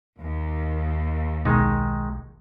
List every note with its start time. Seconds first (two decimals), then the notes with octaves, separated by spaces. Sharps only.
0.20 D#2
1.45 B1 D#3 G#3 D#4